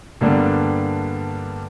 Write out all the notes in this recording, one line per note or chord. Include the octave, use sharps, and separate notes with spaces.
G2 D3 G3 A#3 B3 D4